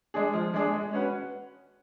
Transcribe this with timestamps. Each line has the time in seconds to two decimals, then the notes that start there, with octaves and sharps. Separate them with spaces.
0.14 G#3 D4 G#4
0.33 F3
0.54 G#3 D4 G#4
0.74 G#3
0.93 C#4 F#4 B4